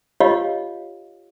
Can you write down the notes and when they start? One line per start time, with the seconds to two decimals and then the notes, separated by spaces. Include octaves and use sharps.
0.20 F4 G4 C#5 D#5 F5